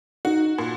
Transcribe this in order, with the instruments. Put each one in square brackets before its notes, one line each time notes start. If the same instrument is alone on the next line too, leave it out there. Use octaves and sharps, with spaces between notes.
[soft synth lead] D#4 [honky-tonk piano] F#4
[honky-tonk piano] A#2